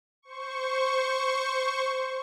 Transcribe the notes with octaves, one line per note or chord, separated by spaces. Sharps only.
C5 C#6